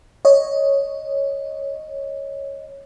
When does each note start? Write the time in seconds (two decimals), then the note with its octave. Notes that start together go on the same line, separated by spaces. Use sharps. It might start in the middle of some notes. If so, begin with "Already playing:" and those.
0.25 C#5 D#5